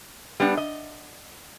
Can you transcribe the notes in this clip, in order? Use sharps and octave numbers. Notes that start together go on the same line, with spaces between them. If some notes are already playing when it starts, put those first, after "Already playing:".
G3 B3 D4
D#5